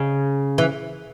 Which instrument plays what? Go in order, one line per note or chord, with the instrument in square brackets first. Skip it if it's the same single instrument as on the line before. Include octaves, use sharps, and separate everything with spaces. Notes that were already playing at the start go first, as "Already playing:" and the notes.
Already playing: [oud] C#3
E3